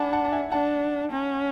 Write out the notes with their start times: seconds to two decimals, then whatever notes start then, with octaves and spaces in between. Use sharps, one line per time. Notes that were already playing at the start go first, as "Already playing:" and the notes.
Already playing: D4 F#5 G#5 A5 B5 D6
0.13 F#5 A5
0.25 A5
0.32 E5 G#5
0.52 D4 F#5 A5
1.11 C#4